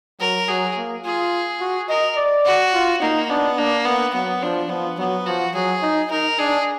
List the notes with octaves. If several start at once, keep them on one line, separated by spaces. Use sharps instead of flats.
F#3 A#4
F#3 G#4
A#3
F4 G#4
F#4
A#4 D#5
D5
F#4
F4
A#3 D#4
B3 D4
A#3 D4
A#3 B3
F#3 B3
F3 D4
F3 B3
F#3 B3
F3 F#4
F#3 G#4
D#4
D#4 A#4
D4 G#4